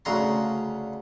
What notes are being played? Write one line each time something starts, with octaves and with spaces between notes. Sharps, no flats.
D2 C#3 A#5 C6